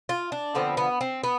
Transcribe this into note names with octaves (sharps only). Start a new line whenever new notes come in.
F4
D4
D3 F3 B3 C4
B3
C4
B3